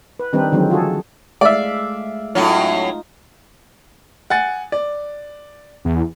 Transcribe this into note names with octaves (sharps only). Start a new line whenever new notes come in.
B4
D#3 G3 C4 D4 D#4 B4
D3 D#3 F3 F#3 G#3 C4
F4 F#4 G#4 A4
G#3 A3 D5 E5 F5
A2 F#3 C#4 D#4 F4
F#5 G#5 A6
D5
E2